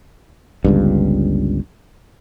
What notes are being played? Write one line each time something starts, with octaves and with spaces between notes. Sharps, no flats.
G1 C#2 G2